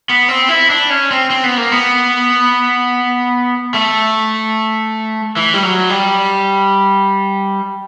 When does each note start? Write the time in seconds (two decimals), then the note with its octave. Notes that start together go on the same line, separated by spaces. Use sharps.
0.09 B3
0.29 C4
0.49 E4
0.70 D4
0.90 C#4
1.11 C4
1.30 C4
1.44 B3
1.57 A#3
1.72 B3
3.74 A3
5.37 E3
5.54 G3
5.63 F#3
5.90 G3